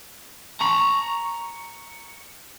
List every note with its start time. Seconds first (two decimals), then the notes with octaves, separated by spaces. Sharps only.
0.61 A#5 B5 C#6